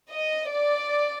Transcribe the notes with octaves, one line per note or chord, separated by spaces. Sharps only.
D#5
D5